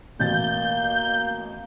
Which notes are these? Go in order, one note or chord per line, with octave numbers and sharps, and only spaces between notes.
A1 B2 A#3 G6 A6